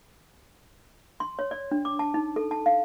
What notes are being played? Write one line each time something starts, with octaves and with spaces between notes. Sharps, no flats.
C6
C#5
D5
D4
D6
A5
D#4
A4
A5
F5